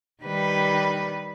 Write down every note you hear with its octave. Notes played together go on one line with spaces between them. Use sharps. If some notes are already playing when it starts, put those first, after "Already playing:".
D#3 G3 B4